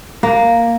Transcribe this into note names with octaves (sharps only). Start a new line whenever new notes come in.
A#3